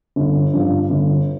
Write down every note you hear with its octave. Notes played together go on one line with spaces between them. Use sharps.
G1
G2 F3
G1